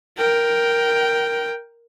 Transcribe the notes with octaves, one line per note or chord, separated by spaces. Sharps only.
A#4 G5